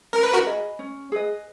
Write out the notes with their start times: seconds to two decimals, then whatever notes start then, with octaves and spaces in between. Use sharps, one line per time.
0.13 C#4 A#4
0.23 B4
0.33 F#4 A#4
0.46 G#4 B4 D#5
0.79 C#4
1.12 G#4 B4 D#5